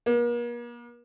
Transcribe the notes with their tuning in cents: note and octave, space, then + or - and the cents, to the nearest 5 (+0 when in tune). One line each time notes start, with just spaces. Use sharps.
A#3 +40